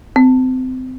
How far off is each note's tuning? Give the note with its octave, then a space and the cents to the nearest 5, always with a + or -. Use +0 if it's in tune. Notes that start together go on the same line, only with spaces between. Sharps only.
C4 -30